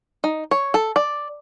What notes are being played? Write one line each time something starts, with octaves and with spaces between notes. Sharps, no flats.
D#4
C#5
A4
D5